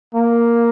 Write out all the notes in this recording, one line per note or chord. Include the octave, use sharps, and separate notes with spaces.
A#3